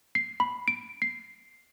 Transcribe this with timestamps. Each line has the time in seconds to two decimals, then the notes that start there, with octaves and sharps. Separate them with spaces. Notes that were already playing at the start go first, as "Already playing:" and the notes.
0.15 C7
0.40 B5
0.68 D7
1.02 C7